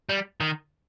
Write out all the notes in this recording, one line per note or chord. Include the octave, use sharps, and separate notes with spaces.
G3
D#3